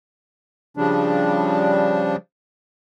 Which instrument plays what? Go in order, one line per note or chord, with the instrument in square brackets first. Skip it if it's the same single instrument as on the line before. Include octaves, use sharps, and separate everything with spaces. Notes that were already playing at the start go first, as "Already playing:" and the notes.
[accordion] C#3 F3 G3 D4